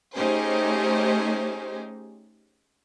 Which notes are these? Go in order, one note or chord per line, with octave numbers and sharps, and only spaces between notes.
A3 C#4 D#4 G4 G#4 C5